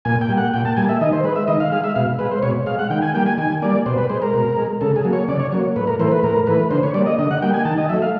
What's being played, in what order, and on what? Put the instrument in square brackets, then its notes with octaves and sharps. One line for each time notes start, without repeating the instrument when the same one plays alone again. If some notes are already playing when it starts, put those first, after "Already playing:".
[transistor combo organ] A#2 G#5
G5
G3 A#3
F#5
A#2 G5
A5
G3 A#3 G#5
E5
D#3 D#5
C5
G#3 B4
E5
D#3 D#5
F5
G#3 F5
E5
B2 F5
G#3 B4
C5
B2 C#5
G#3 F5
F#5
D#3 G5
G#5
G3 A#3 G5
G#5
D#3 G#5
G3 A#3 D5
B2 C5
B4
G#3 C5
A#4
B2
G#3
C#3 A4
G#4
F#3 A#3
C#5
C#3 D5
C#5
F#3 A#3 C#5
A2 B4
A#4
E3 A3 C5
B4
A2 A#4
E3 A3 B4
D3 C5
C#5
G3 A#3 D5
D#5
D3 D#5
F#5
G3 A#3 G5
G#5
D#3 A5
D#5
F#3 A3 E5
F5